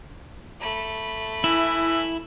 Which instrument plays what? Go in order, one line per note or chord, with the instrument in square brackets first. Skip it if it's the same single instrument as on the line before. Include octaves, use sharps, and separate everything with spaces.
[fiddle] A3 B5
[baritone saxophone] E3 [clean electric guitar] E4